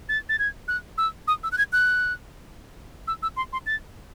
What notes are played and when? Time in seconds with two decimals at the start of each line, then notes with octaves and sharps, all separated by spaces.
0.09 A6
0.29 A6
0.39 G#6
0.68 F#6
0.98 E6
1.27 D#6
1.43 E6
1.52 F#6
1.58 G#6
1.72 F#6
3.07 E6
3.22 E6
3.36 C6
3.53 C6
3.66 A6